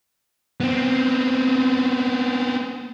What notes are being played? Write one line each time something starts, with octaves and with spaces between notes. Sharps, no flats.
B3 C4